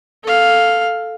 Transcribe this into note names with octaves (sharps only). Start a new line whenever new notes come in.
A4 F5